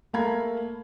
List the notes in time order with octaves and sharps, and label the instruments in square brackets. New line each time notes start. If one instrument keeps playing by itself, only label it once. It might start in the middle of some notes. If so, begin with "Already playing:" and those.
[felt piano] A3 A#3 F5 A#5 B5 G#6